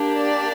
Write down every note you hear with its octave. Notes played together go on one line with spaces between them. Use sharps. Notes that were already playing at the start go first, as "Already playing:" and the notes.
Already playing: A#3 D4 G4
D5